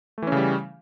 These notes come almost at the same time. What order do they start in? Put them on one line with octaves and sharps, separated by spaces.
A3 E3 C#4 C#3 G3